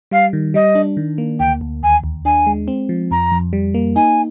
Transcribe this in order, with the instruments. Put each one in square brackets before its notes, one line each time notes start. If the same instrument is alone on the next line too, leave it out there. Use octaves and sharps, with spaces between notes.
[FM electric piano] G3 [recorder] F5
[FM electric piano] D#3
[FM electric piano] G3 [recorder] D#5
[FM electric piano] D4
D#3
A#3
[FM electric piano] D2 [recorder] G5
[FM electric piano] D2
[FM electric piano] D#2 [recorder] G#5
[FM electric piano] D#2
[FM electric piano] D4 [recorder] G#5
[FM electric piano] G#3
C4
F3
[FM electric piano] F2 [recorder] A#5
[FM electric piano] F2
G3
A#3
[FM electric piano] D#4 [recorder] G#5